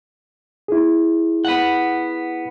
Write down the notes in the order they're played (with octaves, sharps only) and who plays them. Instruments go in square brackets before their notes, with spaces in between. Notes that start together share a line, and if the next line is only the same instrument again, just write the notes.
[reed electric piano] E4 G#4
[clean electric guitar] B3 F#5